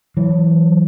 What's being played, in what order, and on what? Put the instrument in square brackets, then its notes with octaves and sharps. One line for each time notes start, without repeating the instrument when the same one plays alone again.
[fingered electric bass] E3 [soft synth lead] F#3